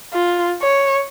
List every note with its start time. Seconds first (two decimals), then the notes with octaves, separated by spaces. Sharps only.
0.14 F4
0.62 C#5